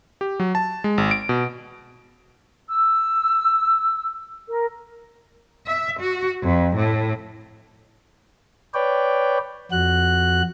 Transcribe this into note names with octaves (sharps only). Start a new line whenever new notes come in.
G4
F#3
A5
G#3
G#1
D7
B2
E6
A#4
E5
F#4
F2
A2
B4 C#5 D5 G5
F2 F#4 F#6